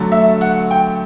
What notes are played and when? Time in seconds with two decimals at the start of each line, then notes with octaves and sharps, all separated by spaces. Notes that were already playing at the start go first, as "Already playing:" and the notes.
Already playing: D3 F#3 A3
0.12 E5
0.41 F#5
0.71 G5